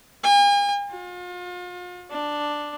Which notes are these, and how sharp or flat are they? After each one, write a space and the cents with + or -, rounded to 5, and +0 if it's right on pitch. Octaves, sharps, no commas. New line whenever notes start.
G#5 -45
F4 +40
D4 +5